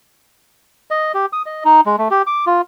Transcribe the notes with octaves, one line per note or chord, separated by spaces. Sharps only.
D#5
G4
D#6
D#5
D#4
G#3
A3
G4
D6
F4